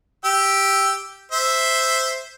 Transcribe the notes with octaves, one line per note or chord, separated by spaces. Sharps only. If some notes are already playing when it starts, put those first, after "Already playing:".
G4 E6
C5 E5